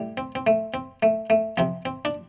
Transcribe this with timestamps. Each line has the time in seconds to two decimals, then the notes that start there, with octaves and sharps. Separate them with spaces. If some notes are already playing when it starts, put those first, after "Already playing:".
Already playing: A2 G3
0.17 C4
0.35 C4
0.47 A3
0.74 C4
1.03 A3
1.30 A3
1.57 C3 F3 C4
1.85 C4
2.05 D4